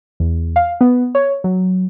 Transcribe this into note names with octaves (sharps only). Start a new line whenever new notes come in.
E2
F5
B3
C#5
F#3